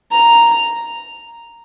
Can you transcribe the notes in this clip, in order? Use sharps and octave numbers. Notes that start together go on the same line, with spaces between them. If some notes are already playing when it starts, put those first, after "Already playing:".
A#5